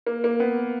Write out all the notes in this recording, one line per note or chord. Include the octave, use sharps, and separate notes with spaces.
A#3
A#3
B3